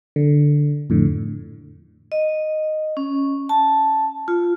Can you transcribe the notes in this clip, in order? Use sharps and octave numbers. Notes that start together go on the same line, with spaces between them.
D3
F2 A2 D3
D#5
C#4
A5
F4